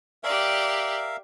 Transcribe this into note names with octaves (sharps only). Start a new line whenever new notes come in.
G4 A#4 D5 E5 F5